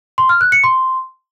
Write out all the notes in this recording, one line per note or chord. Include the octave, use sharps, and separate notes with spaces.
C6
F6
F#6
C#7
C6